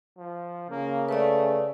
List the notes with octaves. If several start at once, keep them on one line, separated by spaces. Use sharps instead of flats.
F3
C#3 A#3
A3 B4 D5